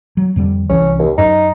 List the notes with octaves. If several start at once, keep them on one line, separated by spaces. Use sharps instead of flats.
F#3
F2 D3 G3
C2 E3 C#4
D#2
F#2 D#4